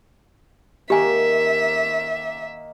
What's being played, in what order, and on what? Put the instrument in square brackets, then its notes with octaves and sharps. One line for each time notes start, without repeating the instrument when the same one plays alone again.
[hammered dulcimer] D#3 A#3 [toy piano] G4 G#5 [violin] E5